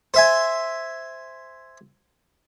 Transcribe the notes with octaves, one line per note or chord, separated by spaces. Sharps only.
C5 E5 G#5